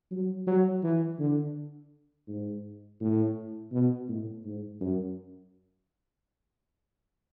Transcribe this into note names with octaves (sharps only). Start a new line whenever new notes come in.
F#3
F#3
E3
D3
G#2
A2
B2
A2
G#2
F#2